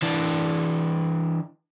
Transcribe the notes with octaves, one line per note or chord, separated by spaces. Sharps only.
E3 D4